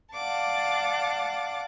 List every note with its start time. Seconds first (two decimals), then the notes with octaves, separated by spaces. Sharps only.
0.14 D5 F5 F#5 A5 D6